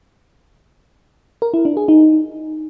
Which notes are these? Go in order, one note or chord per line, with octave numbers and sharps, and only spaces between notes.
A#4
E4
D4
G#4
D#4